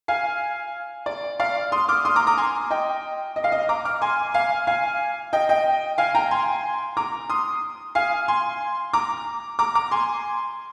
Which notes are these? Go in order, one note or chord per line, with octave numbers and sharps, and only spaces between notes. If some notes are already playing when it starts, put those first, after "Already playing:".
F5 G#5
D5
D5 F5
C6 D#6
D6 F6
C6 D#6
A#5 D6
A#5 D6
G#5 C6
D#5 G5
D#5
F5
D#5
A#5 D6
D6 F6
G#5 C6
F5 G#5
F5 G#5
D#5 G5
D#5 G5
F5 G#5
G5 A#5
G#5 C6
A#5 D6
C6 D#6
F5 G#5
G#5 C6
A#5 D6
A#5 D6
A#5 D6
G#5 C6